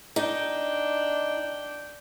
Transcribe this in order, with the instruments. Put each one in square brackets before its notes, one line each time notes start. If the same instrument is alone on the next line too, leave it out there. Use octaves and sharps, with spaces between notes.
[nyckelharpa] D4 G5 [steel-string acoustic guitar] D#4